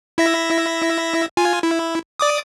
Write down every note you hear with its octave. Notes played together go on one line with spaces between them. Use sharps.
E4 E5 A#6
F4 G#5
E4
D5 D6 D#6